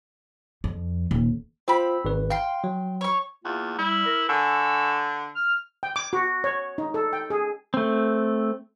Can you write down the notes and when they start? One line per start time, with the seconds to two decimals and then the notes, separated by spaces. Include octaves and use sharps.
0.64 F2
1.11 D#1
1.68 C4 F4 C5 B5
2.05 G#1 B4
2.30 F5 G5 C6
2.64 F#3
3.01 C#5 C#6
3.45 E2 A#3 F4
3.78 G3 E4
4.06 A#4
4.29 D3 G#5 C#6 E6
5.36 F6
5.83 G5
5.96 D6
6.13 F#4
6.44 C#5
6.78 D#4
6.94 A4
7.13 G5
7.30 G#4
7.74 A3 C4